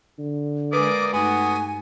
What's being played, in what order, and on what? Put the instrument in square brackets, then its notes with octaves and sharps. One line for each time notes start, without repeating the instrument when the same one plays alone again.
[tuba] D3
[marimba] G#3 B4 [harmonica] A#3 D5 D#6 [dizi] D6
[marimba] G2 D#4 [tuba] A3 [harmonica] B3 F#4 D#6 [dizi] G#5